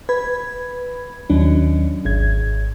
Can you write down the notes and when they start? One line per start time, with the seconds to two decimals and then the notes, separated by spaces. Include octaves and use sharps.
0.09 B4 B5 G#6
1.30 D#2 F#3 C#4 D4
2.05 G#1 G#6